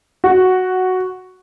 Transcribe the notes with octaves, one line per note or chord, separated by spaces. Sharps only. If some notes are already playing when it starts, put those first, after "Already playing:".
F#4